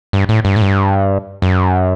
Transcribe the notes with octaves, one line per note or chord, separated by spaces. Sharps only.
G2
A2
G2
A2
G2
F#2